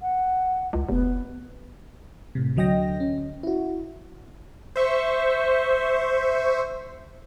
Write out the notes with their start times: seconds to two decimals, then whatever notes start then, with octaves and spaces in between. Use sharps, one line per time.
0.02 F#5
0.73 C#2
0.89 F1 B3
2.35 A2 C3
2.56 D2 D3 F#3 D#5 G5 A#6
3.00 C#4
3.43 E4 F#4
4.76 C5 E5 C#6